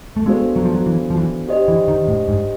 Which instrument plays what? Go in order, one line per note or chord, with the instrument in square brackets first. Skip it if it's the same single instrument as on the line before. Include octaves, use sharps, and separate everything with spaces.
[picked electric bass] A3
[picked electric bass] G#3 [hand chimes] B3 D4 F#4 A4 C5
[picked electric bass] F#3
F3
F#3
E3
F3
E3
[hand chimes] D4 G4 C5 D#5
[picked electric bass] E3
D#3
A2
G#2